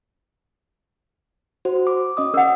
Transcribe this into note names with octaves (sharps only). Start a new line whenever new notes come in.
F#4 C5
D6
C#4 D#5 D#6
C#4 A#4 F#5